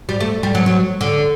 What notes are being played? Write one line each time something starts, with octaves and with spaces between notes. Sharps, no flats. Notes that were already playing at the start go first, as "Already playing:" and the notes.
G3
A3
G3
F#3
F#3
D3